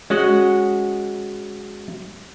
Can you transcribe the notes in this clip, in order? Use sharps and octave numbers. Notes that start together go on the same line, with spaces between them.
G#3 C#4 F#4 D#5 F#5